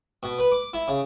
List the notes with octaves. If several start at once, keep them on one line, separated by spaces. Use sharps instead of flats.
B2
B4
D6
E4
C#3